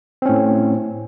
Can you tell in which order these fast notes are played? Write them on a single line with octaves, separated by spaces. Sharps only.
C4 C#4 A2